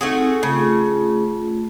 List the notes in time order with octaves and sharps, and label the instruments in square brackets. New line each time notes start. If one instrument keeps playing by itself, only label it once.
[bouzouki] A3 F#4 G#4 [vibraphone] C4 D#4
[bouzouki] C#3 [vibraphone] A3 F4